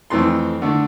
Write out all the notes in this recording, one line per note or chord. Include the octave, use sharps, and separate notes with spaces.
F2 E3 A3 C4 C6
D3 A3 D4